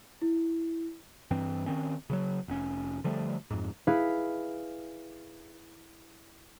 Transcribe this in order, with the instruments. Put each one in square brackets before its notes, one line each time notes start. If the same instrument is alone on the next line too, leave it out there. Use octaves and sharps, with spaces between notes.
[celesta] E4
[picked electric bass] G2 E3 C4
D#3 C4 C#4
C#3 F3 F#3
F1 C#4
D3 F3 G3 A3
F2 G#2
[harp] E4 G#4 B4 F5